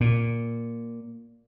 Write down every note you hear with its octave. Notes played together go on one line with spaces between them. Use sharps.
A#2